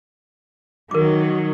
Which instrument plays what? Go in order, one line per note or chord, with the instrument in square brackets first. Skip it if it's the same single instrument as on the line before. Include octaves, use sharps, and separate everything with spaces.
[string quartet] D#3 F#3 [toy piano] A#4 D6